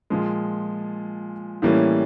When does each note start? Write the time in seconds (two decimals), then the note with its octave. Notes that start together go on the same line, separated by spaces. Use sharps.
0.10 A#2 F3 G#3
1.62 A2 E3 G3 A#3 C#4